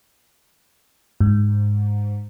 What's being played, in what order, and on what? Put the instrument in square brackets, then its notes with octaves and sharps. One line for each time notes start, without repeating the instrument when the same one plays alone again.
[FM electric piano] G#2